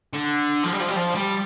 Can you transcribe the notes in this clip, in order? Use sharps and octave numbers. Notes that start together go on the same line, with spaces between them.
D3
F3
G3
F3
G3
F3
G3